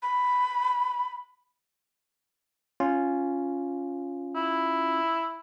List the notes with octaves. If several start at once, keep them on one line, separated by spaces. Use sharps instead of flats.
B5
C#4 F4
E4